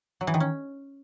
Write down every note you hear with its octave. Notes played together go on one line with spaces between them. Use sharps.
F#3
E3
D#3
C#4